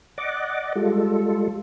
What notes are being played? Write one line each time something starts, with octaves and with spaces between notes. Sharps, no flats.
D5 D#5 F#5 D6
G3 G#3 F4 A4